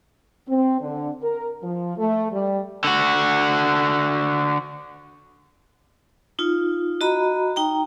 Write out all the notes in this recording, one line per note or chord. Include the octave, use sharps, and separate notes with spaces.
C4
D3
A#4
F3
A3
G3
D3 F#4
D#4 F4
F#4 D#5 A#5 B5
D#4 G5 A#5